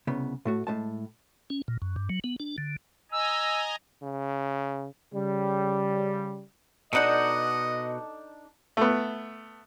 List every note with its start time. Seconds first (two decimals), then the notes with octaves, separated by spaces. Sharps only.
0.07 C2 C#3 B3
0.45 A2 A3 F#4
0.67 A2 G#3 A5
1.50 C#4
1.68 A#2
1.82 F#2
1.96 G2
2.10 F#3
2.24 B3
2.40 D4
2.58 D3
3.12 D#5 G#5 A#5 E6
4.02 C#3
5.14 C#3 G3
6.93 B2 D4 D#4 A4 D#5 F#5
8.77 A3 B3